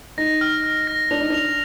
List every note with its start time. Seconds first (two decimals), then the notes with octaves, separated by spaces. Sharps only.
0.18 D#4 A#6
0.41 F6
0.64 F6
0.87 A#6
1.11 D4 F7
1.21 D#4
1.30 D4 F7